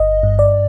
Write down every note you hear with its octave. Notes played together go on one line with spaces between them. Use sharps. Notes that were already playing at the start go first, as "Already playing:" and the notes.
Already playing: G1 D#5
G2
D5